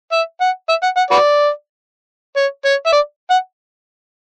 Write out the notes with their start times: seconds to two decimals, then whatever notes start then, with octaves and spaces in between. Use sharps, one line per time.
0.12 E5
0.41 F#5
0.69 E5
0.83 F#5
0.97 F#5
1.11 F#4 B4 D5
2.37 C#5
2.65 C#5
2.86 E5
2.93 D5
3.31 F#5